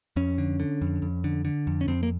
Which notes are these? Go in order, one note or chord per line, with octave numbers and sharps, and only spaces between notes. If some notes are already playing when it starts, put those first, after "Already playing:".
F2 C#4
D3
D3
F2
F2
D3
D3
F2
C#4
F2 C4
A#3